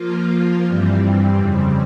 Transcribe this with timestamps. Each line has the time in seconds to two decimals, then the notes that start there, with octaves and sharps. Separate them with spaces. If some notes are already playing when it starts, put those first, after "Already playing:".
Already playing: F3 A#3 F4
0.65 G2 E3 G3 C4
1.37 F2 C#3 G3 C4